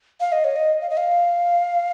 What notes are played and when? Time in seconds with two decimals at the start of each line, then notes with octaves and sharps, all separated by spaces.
0.20 F5
0.32 D#5
0.44 C#5
0.56 D#5
0.81 F5
0.90 D#5
0.97 F5